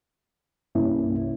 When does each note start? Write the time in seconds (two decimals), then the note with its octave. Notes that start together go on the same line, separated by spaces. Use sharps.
0.75 C2 G2 A#3 C#4 E4